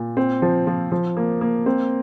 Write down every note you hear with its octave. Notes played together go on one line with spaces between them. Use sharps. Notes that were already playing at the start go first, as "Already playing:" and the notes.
Already playing: A#2
C4
F3
F3
F3
A#3
A#3
C4